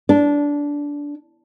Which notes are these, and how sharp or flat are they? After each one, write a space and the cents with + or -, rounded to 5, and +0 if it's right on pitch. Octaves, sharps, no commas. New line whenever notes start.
D4 -15